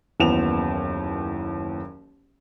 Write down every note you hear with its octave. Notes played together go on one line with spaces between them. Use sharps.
F#1 D#2 E3 B3 E7 F7